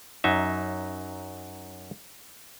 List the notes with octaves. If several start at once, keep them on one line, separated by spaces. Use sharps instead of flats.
F#2 F#3 D#4 E5